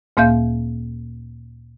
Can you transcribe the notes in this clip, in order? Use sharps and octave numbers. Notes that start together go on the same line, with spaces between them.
D2 A#2 A#3 E5 F5 G6